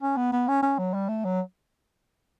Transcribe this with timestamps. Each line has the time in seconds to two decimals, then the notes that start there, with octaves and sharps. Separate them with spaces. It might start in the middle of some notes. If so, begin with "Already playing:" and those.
0.02 C#4
0.17 B3
0.32 B3
0.48 C#4
0.63 C#4
0.78 F#3
0.94 G3
1.09 A3
1.25 F#3